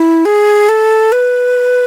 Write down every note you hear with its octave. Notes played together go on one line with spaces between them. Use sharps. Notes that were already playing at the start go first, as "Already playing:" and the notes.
Already playing: E4
G#4
A4
B4